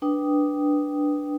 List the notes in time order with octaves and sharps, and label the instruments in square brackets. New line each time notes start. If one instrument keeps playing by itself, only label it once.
[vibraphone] D4 B4 G5 D#6